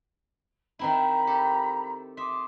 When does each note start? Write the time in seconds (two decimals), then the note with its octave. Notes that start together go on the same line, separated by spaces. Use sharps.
0.79 D#3 C4 E4 A#5 B5
1.27 G4 A4
2.17 E5 C6 D6 D#6